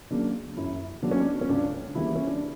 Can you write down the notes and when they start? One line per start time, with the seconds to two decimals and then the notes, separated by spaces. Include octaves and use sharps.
0.11 C#3 F#3 A#3 D4
0.57 F#2 E4
1.02 C#3 F#3 A#3 D4
1.11 C#4
1.20 D4
1.41 C#4
1.49 C#2 D4
1.95 C#3 E3 G3 A#3 E4
2.16 C#4
2.28 D4